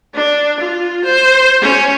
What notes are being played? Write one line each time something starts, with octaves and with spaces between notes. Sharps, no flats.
D4
F4
C5
C#4